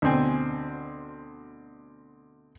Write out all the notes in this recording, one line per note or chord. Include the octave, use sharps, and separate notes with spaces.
D2 B2 C4 G#5